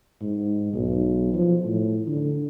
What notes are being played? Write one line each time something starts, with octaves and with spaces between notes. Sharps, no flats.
G#2
B1
F3
A2
D3